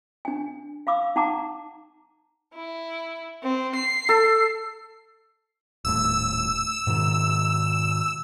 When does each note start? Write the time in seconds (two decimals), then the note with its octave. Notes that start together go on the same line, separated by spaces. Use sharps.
0.25 D4 G#5
0.87 F5 B5 D6 E6
1.16 D#4 F#5 A5 A#5 D6
2.55 E4
3.43 C4
3.75 C7
4.09 A4
5.85 D#1 A2 E6
6.87 G#2 B2 D#3